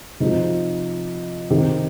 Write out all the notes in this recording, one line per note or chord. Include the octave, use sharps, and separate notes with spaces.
C3 F3 D#4
C3 D#3 G4